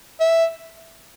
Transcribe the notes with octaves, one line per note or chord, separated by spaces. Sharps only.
E5